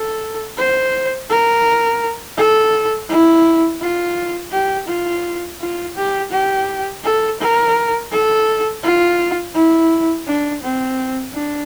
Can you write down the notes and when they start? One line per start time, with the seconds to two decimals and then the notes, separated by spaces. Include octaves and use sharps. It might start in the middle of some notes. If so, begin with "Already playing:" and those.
Already playing: A4
0.57 C5
1.30 A#4
2.37 A4
3.09 E4
3.81 F4
4.52 G4
4.88 F4
5.60 F4
5.96 G4
6.31 G4
7.04 A4
7.40 A#4
8.12 A4
8.83 F4
9.55 E4
10.27 D4
10.63 C4
11.33 D4